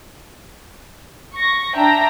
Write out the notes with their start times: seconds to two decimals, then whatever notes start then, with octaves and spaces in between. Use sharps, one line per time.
1.35 C#6 A#6
1.76 D4 E5 G5 A#5 A#6